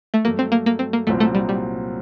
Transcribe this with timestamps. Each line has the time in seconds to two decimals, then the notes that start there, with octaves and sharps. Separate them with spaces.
0.14 A3
0.25 G2 F#3 A3 A#3
0.39 C4
0.52 A#3
0.66 A#3
0.79 C4
0.93 A#3
1.07 C2 A#2 F#3 A3 C4
1.20 A3
1.35 G3
1.49 G3